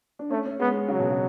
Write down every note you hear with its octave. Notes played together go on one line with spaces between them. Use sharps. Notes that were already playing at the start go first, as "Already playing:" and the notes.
D4
A3 C#4
C#4
G#3 B3
G#3
C#3 F#3
B2
C#3